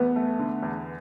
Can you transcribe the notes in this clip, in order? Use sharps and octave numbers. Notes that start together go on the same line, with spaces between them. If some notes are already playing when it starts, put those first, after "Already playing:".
Already playing: E2 B3
A3
D3
E2